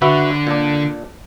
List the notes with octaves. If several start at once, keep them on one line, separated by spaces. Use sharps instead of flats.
D3 F#4 B4 E5
A#2 D4